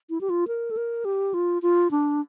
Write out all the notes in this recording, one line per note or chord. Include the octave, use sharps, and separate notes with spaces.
E4
G4
F4
A#4
A4
A#4
G4
F4
F4
D4